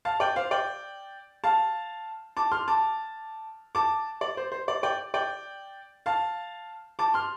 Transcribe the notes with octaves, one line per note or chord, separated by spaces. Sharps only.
F5 A5
D5 G5
C5 F5
D5 G5
F5 A5
A5 D6
C6 F6
A5 D6
A5 D6
D5
C5
C5
D5
D5 G5
D5 G5
F5 A5
A5 D6
C6 F6